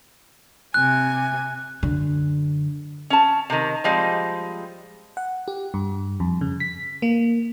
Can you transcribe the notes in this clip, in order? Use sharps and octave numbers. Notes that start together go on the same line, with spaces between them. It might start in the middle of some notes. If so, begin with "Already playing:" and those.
C3 G#5 F#6
F#2 D3
C#4 A5
C3 D#3
F3 G3 G#3 C4
F#5
G4
G2
F2
C#3
B6
A#3